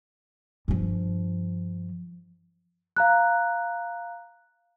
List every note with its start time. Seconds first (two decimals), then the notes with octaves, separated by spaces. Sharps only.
0.68 G2 F3
2.97 F5 A#5 F#6